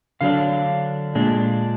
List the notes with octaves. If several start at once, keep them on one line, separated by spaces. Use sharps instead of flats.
D3 F#3 D4 F5
A#2 G#3 D4